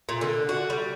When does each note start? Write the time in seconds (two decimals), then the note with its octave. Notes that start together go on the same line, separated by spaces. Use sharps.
0.09 A#2
0.21 D3
0.49 F#4
0.70 G3